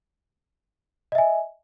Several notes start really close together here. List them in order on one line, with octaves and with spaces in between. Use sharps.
D#5 E5 G#5